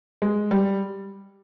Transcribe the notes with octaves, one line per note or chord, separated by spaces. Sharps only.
G#3
G3